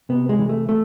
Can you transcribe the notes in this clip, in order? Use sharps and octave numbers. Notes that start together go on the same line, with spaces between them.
C3 B3
G#3
E3
A3
A3